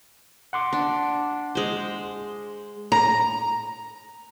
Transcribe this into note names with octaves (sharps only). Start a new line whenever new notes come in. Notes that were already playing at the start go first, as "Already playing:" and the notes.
F#5 C6 D6
D4
G#3 C5
A#5